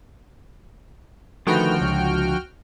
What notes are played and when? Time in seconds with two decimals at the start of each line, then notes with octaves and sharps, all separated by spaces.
1.47 D3 D#3 F3 A3 F#4 B4 G5 F6
1.81 C#2